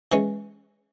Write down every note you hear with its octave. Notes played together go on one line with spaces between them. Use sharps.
E3 G#3 C#4